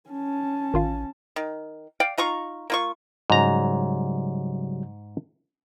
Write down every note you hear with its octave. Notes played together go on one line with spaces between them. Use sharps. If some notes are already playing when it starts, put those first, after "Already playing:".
C#4 A5
A1 D#3 F4 F5
D#3
D5 F5 G5
D#4 F4 A#5 C#6
A#3 F4 C#6
G#2 C#3 F#3 G3 A#5